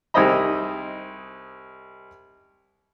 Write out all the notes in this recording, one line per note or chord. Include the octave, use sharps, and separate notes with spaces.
C2 D#4 G#4 C5 D#5 B5